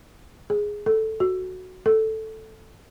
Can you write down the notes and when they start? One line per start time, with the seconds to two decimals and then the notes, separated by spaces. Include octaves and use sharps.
0.50 G#4
0.86 A4
1.20 F#4
1.86 A4